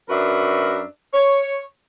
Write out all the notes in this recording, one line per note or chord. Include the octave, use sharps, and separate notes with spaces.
F#2 D4 F#4 A#4 B4 E5
C#5